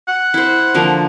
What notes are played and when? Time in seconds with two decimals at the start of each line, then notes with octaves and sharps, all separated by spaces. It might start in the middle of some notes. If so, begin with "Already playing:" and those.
0.08 F#5
0.34 E4 C5
0.74 D3 F3 A#3